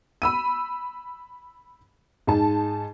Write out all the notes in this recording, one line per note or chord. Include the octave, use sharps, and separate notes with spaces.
B5 E6 D#7
G#2 D#4 A5